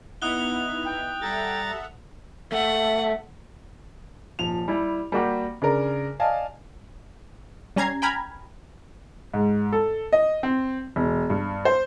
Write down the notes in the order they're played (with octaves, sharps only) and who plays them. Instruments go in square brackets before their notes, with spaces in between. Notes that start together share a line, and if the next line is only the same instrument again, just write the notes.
[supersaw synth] B3 D#4 E4 [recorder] F#5 [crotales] D#6 F#6 G7
[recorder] G5
[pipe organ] G3 A#5 A6 [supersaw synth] A4 E5 F#5
[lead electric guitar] A3 [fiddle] F#5
[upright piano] D#1 F3 F7
G3 E4
G3 A#3 F#4 G4
C#3 D4 A#4 A#5
D5 D#5 F5 G#5 A5
[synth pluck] G3 C#4 A#5 G#6 C7
G5 G#5 A#5 B5 F6 G#6
[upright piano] G#2
A4
D#5
C4
E1
G2
C5